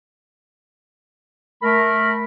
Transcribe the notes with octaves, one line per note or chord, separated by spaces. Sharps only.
A3 A#4 B5